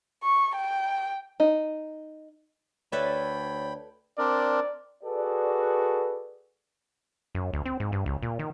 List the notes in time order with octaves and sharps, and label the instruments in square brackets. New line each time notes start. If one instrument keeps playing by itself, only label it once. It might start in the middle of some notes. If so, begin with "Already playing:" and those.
[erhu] C#6
G5
[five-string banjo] D#4
[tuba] D2 [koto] A4 B4 E5 [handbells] C#5 D5 [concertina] G5 B5
[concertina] C4 D4 A#4 [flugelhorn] D5
[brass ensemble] F#4 G#4 A4 B4 D5
[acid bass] F#2
D2
C4
G#2
G2
C#2
A#2
D#3